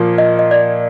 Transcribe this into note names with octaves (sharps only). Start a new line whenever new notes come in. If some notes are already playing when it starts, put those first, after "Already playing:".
Already playing: A#2 F3 A#3
D#5
D#5
D5